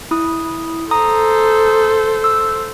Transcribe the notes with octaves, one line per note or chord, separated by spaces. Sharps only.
E4 D#6
A4 C5 A#5 D#6
E6